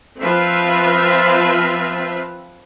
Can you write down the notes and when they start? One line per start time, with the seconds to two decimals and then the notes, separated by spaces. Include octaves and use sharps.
0.21 F3 C4 F4 B4 E5